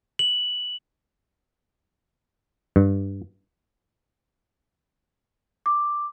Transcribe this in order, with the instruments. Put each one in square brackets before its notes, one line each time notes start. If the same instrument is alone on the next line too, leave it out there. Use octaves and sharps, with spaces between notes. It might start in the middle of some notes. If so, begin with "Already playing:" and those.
[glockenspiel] F#7
[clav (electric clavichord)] G2
[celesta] D6